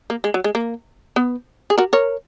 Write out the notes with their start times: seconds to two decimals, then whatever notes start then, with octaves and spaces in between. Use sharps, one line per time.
0.10 A#3
0.24 G#3
0.34 F#3
0.44 G#3
0.55 A#3
1.16 B3
1.70 G#4
1.78 F#4 A#4
1.93 A#4 C#5